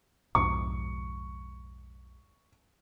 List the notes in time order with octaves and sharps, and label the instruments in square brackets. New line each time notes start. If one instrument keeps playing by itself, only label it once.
[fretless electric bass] B1 F2 G#2 [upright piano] C#6